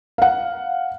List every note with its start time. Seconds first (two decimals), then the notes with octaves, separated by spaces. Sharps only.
0.18 F5 F#5